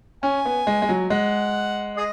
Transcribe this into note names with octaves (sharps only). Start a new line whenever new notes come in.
C#4 G#5
B3
G#3
G#3
F#3
G#3 F#5
G#4 D#5